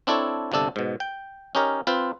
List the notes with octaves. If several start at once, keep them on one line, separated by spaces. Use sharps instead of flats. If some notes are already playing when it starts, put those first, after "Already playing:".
C4 D4 E4 A4 C#5
G1 C3 D4 A4
G#2 B2
G5
C#4 D#4 G4 A#4 C#5
C4 F4 B4 C5